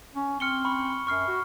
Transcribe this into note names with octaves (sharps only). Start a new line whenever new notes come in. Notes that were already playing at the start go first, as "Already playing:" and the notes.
C#4
C4 F6 C#7 G7
B5 C#6
F#2 C#6 F6 C7
F#4